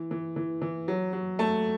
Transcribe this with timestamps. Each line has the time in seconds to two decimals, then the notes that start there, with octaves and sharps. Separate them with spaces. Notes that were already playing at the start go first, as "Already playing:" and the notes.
Already playing: E3
0.11 E3
0.36 E3
0.62 E3
0.88 F#3
1.13 F#3
1.39 A3 A5